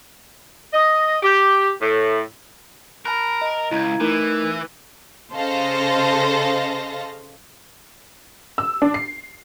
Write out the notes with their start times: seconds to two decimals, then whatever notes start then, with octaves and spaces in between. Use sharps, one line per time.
0.73 D#5
1.23 G4
1.81 A2
3.05 A#4 A5 B5 F#6
3.41 D#5
3.71 C#2 E4 A#5 G#6
4.00 E3 A3 D#4 A#4
5.33 C#3 A4 C5 D#5 F5 A#6
8.58 E6
8.82 D4
8.94 C7